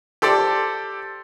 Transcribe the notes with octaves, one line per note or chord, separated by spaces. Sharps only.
G4 A4 C5 D5